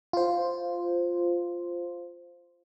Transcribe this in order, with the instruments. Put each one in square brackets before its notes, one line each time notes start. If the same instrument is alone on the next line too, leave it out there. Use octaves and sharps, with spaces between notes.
[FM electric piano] F4 C5